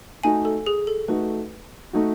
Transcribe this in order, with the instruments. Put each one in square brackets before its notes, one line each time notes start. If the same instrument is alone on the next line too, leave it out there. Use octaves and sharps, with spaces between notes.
[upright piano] A3 D#4 F#4 [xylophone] G#5
[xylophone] A4
G#4
A4
[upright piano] A3 D#4 F#4 [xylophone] B4
[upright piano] A3 D#4 F#4